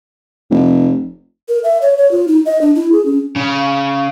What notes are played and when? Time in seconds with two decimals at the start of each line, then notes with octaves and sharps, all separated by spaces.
0.50 F1
1.49 A#4
1.64 E5
1.82 C#5
1.98 C#5
2.11 F4
2.28 D#4
2.46 D#5
2.61 D4
2.75 E4
2.92 G#4
3.05 C#4
3.36 C#3